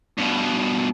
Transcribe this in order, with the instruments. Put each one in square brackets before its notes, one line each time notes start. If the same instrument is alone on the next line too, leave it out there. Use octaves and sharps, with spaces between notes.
[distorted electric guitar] G2 B2